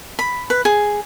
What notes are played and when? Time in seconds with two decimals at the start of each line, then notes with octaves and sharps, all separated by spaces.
0.19 B5
0.50 B4
0.65 G#4